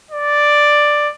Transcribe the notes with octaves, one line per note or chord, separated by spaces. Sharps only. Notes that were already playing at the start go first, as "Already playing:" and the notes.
D5